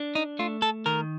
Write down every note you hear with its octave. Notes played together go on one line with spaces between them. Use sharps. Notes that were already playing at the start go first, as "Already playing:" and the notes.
Already playing: D4
D#4
A3 F4
A4
D#3 A#4